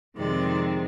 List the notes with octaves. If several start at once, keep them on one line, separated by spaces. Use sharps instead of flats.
F2 C3 D#3 G#3 C4 D5